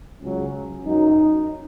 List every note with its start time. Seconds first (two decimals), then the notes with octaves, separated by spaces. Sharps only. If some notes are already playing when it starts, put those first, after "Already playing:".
0.22 C#2 C#3 F#3 C#4
0.85 F#2 F#3 D#4